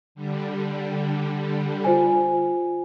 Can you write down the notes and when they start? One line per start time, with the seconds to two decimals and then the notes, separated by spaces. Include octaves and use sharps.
0.15 D3 G3
1.84 F4 C5 G#5